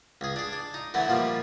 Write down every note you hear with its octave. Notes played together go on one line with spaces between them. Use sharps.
C#2 G#4
D4 G#4
D4
D#4
D3 E3 F#3 A3
A#2 F3 G3